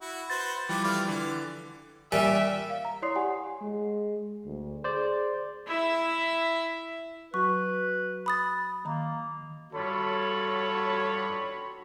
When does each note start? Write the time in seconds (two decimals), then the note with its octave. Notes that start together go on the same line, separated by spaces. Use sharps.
0.01 E4 F#4
0.30 F#4 B4 C5 A6
0.69 E3 F3 G3 G4 B4 D6
0.84 A3 D5 F5
1.08 D3 E3 D6
2.12 A#2 G3 C#4 E5
2.70 F5
2.85 A#5
3.02 E4 C#5 D5 C6 D#6 C7
3.16 G4 F#5 G#5
3.62 G#3
4.45 D2
4.84 G#4 C5 D5
5.67 E4 E5
7.34 F#3 F#4 B4 C#6
8.26 B5 D#6 A6
8.85 D#3 A#3 A#5
9.74 G2 G3 F4 F#4 A4 C#5 B5